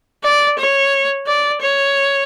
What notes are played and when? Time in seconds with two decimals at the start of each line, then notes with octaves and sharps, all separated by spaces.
0.24 D5
0.59 C#5
1.27 D5
1.61 C#5